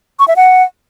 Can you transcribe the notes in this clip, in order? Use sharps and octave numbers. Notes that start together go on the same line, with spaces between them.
C#6
E5
F#5